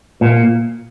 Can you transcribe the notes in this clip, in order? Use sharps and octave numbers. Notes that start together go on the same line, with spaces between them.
A#2